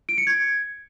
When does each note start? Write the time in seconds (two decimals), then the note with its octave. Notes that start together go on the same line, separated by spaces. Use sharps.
0.09 D7
0.18 C#7
0.27 G#6